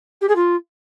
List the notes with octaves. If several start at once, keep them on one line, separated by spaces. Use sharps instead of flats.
G4
G#4
F4